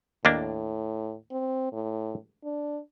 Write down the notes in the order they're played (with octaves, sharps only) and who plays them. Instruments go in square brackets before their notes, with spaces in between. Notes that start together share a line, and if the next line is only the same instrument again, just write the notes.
[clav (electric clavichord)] D#2 A#3 D4 [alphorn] A2
[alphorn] C4
A2
D4